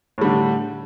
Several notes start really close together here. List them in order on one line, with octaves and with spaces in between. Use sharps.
A2 G3 D3